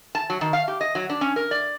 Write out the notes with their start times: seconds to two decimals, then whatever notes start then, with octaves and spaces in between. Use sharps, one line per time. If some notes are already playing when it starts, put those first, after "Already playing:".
0.15 A5
0.30 F#3
0.41 D#3
0.53 F5
0.68 G4
0.81 D#5
0.95 F#3
1.10 D4
1.21 C#4
1.36 A#4
1.51 D5